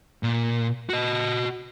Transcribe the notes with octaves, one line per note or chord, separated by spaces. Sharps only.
A#2
F#4 D#5